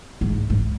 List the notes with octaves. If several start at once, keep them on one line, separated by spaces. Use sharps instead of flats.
G#2
G#2